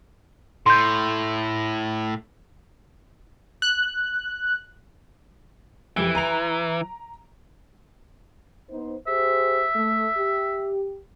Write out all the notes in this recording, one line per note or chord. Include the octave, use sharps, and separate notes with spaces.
A2 C6 G6
F#6
F2 E3 G4 D7
A#5 F7
B3 D#4 C5
G4 G#4 C5 E5
A3
G4